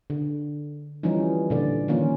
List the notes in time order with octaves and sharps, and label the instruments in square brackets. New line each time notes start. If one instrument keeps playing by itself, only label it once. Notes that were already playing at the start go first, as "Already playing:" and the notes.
[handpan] D3
E3 F3 G3 C#4 D#4
A#2 D3 D5
D#3 F3 A#3 C#4 F4